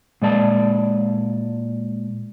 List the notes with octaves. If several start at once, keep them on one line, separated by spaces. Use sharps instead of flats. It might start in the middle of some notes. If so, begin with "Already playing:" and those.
A#2 G#3 D5 A5